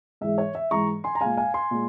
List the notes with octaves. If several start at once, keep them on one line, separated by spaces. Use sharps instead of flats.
G#2 E3 G#3 E5
C#5
E5
G#2 E3 G#3 A#5 C#6
G#5 C6
A#5
A#2 G#3 F5 G#5
F5 G#5
G#5 C6
A#2 G#3